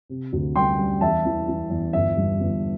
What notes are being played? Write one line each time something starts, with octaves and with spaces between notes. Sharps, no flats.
C3
D2
G3 G5 C6
G3
E2 E5 A5
E3
E3
E2
G1 E5
G2
G1